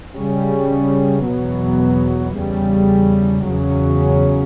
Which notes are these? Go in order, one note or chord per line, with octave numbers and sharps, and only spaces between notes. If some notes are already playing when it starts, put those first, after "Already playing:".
C#3 G3 C#4
E2 B2 F#3 B3
E2 C#3 G3
E2 C#3 F#3 C#4